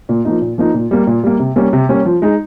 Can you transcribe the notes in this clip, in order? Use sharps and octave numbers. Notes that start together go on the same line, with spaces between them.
A#2
F3 A#3 D#4
A#2
F3 A#3 D#4
A#2
G3 A#3
A#2
G3 A#3
C3
G3 A#3 C#4
C3
G3 A#3 C#4
F3
G#3 D#4